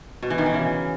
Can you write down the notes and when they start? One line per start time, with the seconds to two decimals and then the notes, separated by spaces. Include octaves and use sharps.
0.23 B2
0.30 E3
0.38 D#3
0.46 E3
0.54 C#3